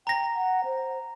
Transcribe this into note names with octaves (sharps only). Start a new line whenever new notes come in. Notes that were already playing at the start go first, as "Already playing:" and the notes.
G5 A#5 A#6
F#5
C5